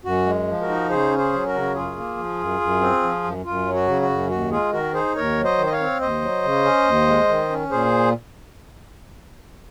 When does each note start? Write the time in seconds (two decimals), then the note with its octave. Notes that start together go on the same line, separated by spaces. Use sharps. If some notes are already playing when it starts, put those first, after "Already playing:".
0.04 F#2 F#4
0.26 G#3
0.47 F3
0.62 F#4 A#4
0.68 D#4
0.89 C#3 G#4 C5
1.11 C#4
1.18 G#4 C5
1.33 F#3
1.47 F#4 A#4
1.54 C#3
1.74 F#2 F4 G#4
1.96 A#3
2.17 F3
2.39 F#2
2.61 F#2
2.81 C4
3.03 F3
3.23 F#2
3.45 F#2 F4
3.66 F#3
3.74 F#4
3.87 C#3
4.02 F#4
4.10 F#2
4.30 D#2 F#4
4.51 G#3 F4 G#4
4.72 D#3 F#4 A#4
4.94 D#4 G#4 C5
5.15 D#2 A#4 C#5
5.37 F#3
5.44 C5 D#5
5.58 D#3
5.66 D#5
5.72 C#5 F5
5.80 C4
6.01 D#2 C5 D#5
6.22 F#3
6.43 C#3
6.64 C#4
6.86 D#2
7.07 G#3
7.29 D#3
7.50 C#4
7.71 A#2 G#4 C5